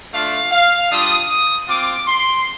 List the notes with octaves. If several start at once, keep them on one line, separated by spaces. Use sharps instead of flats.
A3 D4 F4 F5
F5
G3 D4 F4 D#6
C4 F4 D6
C6